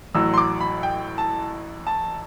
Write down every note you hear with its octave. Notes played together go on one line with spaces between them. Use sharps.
A1 A2 F#3 E6
C6
D6
B5
G5
A5
A5